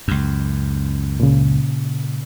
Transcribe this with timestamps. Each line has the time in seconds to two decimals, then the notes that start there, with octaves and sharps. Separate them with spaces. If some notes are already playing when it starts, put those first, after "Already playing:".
0.08 C#2 F#2
1.20 A#2 C#3